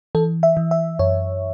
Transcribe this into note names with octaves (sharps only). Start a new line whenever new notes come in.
E3 A4
E5
E3
E5
F#2 C#5